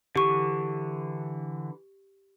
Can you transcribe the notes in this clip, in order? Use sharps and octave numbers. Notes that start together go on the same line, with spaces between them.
D3 E3 G4 C#6